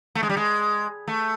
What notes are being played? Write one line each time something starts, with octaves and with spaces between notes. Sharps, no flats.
A3
G#3
G3
G#3
A3